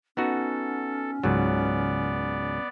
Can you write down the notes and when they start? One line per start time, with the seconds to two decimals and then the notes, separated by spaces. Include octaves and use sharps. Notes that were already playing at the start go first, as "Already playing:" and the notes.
0.17 B3 C#4 D#4 F#4 A4
1.24 C#2 G#2 F#3 B3 D5